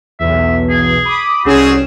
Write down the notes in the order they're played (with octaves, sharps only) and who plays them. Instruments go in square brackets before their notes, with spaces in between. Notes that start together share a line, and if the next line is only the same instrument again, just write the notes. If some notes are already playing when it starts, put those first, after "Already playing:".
[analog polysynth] B1 E2 [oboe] E5
[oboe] G#4
[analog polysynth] B5 D6 D#6
[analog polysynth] C2 C#4 E7 [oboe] C4 [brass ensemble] F#4 G#4